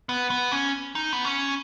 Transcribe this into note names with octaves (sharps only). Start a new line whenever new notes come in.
B3
B3
C#4
D#4
B3
C#4